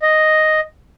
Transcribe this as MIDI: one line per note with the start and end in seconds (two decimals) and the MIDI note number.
0.02 0.60 75